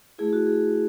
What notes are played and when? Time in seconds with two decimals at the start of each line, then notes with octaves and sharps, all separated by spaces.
0.18 A3 E4 G#4
0.33 F#4
0.47 G#4